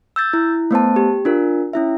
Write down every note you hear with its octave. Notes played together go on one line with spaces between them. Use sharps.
E6 G6 A6
E4
A3 B3 C5 A5
G4
D4 F4 A#4
C#4 E4 E5